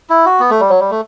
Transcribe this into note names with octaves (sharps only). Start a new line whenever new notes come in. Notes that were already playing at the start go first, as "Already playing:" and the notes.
E4
F#4
B3
A3
G3
F#3
G3
A3